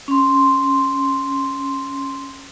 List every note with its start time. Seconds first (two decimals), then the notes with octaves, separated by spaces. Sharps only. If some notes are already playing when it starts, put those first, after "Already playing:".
0.08 C#4 C6